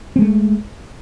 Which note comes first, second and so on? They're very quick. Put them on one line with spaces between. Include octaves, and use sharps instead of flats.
C4 G#3 A3